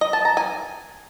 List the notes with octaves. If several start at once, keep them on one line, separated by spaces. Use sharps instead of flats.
D#5
A5
A#5
G#5